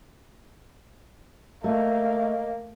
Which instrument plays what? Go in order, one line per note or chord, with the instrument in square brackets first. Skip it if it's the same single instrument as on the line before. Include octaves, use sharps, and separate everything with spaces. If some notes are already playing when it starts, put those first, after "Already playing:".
[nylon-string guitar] A3 [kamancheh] A#3 [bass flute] D#5